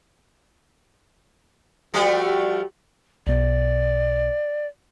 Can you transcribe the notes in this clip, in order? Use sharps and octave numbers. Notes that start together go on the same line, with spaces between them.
F3 G3 A3 F#4 G4
B1 B2 D5